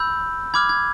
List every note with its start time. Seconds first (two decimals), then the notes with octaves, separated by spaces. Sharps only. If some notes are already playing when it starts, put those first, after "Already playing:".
Already playing: B5 E6 G6
0.54 B5 D6 F6 G#6
0.69 G#6